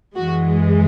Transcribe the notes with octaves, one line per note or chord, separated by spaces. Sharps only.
F#2 E3 G#3 F#4